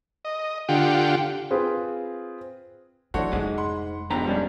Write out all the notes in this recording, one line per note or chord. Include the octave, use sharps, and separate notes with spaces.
D#5
D3 F4 G4 F#5 G5
C4 F4 G#4 B4
E3 F#3 D4 E4 F#4 A4 C5 C#5
F1 G#2 G#3
F#5 B5 C6
F2 G#2 B2 D3 G4 A#5
G3 C#4 D4